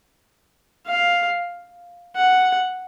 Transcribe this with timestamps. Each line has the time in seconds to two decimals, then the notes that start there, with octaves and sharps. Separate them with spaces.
0.86 F5
2.16 F#5